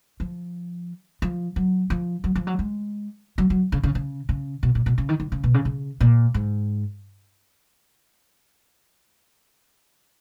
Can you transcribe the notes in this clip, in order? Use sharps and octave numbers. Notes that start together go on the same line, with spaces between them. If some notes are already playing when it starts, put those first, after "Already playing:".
F3
F3
F#3
F3
F#3
F3
F#3
G#3
F#3
F#3
C#3
C#3
C#3
C#3
B2
A#2
B2
C#3
D#3
D#3
C#3
B2
C#3
C#3
A#2
G#2